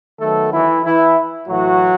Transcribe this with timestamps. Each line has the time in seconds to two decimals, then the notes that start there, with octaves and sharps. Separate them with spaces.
0.19 D#3 F#3 A3 B3 A4
0.52 E3 E4
0.83 E3 E4
1.47 A2 E3 F#3 A3 F#4